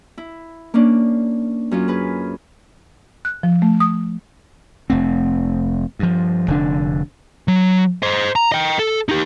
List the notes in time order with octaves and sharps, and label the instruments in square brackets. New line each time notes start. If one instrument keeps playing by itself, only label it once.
[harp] E4
A#3 C#4 D4
F#2 C#4 F4
G#4 B4
[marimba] F#6
F3
A3
D#6
[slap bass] F1 A3 C4
G2 F3
F1 D3 D4
[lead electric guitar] F#3
C5 D#5
A#5
D#5 G5
A4
D#4 G4